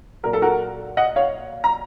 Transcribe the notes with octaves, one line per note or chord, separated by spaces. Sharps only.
A#2 F#3 A#4
A4
F#4 A#4
D#5 F#5
C#5 F5
A#5